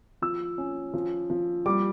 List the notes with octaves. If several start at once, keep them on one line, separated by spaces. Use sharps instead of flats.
F3 E6
C#4
F3
F3
G3 D6